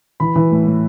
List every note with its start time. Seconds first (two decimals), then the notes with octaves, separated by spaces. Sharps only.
0.20 E3 B5
0.36 E3
0.51 A2
0.67 A2